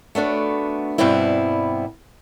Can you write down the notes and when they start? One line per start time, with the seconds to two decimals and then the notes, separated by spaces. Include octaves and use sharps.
0.15 A3 B3 D4 F#4
0.98 G2 B2 G3 B3 C4 E4